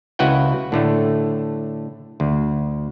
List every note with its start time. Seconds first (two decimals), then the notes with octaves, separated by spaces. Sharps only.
0.19 C#2 E4 F#4 B4 F#5 G5
0.72 A2 D3 A3
2.20 D2